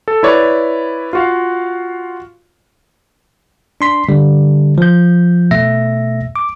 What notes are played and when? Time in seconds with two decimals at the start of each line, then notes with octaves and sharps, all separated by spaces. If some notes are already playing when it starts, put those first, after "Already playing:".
0.08 A4
0.23 E4 B4 C#5 D5 B5
1.13 F4 F#4 F5
3.81 D4 C6 B6
4.09 D3 G3
4.78 F3 G6
5.51 B2 A3 E5 A#6
6.36 D6